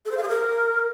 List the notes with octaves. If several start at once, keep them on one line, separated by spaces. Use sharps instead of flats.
A4
C5
F5
G#4
A#4